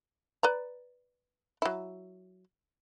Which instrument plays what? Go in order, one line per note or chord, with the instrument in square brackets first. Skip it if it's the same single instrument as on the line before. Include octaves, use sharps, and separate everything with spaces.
[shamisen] B4 D5 A#5
F#3 E4